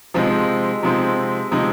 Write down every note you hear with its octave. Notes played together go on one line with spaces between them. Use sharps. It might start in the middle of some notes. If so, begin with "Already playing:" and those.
C3 F3 G#3 C4 D#4
C3 F3 G#3 C4 D#4
C3 F3 G#3 C4 D#4